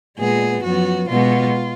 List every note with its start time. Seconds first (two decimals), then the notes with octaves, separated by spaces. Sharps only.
0.17 A#2 G#3 B3 G#4
0.63 F#2 F3 B3 F#4
1.08 B2 G#3 B3 F4